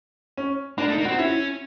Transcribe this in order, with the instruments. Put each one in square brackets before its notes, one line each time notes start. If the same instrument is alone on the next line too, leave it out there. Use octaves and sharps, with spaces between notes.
[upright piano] C#4
[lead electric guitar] A#3 [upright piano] D4
[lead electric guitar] A3
[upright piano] D#4
[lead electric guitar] A#3
[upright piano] F#4
[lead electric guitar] C4
[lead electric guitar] C#4 [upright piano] E4